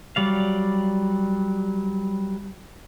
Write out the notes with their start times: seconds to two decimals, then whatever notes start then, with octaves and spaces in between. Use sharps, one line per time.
0.16 F#3 G3 D5 F5